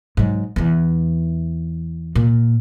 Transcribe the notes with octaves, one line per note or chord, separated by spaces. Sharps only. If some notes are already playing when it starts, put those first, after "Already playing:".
G#2 F#3
E2 E3
A#2